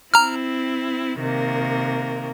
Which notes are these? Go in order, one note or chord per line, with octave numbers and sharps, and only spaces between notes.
C4 E4 A#5 F6
C3 D#3 A#3